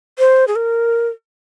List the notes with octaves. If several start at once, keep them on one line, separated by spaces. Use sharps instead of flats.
C5
G#4
A#4